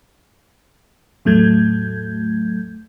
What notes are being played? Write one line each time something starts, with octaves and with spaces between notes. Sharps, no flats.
E2 A2 F#3 A3 G6 G#6